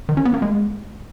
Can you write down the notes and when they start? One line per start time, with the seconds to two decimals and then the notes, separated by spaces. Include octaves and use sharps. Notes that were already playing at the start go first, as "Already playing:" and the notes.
0.09 D#3
0.17 C#4
0.25 B3
0.34 A#3
0.42 G#3